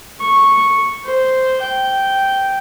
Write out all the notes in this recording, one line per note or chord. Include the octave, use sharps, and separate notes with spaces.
C#6
C5
G5